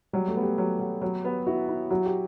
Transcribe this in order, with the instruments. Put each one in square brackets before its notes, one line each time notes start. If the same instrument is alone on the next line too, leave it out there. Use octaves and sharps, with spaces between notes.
[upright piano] F#3 [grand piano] G3
[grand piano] A3
[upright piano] B3
[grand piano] G4
[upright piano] F#3
F#3
F#3
B3
[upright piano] E4 [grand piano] F#4
[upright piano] E4
[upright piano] F#3 [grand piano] F#4
[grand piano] G4